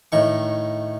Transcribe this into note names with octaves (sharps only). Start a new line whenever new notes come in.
A2 D#3 C#6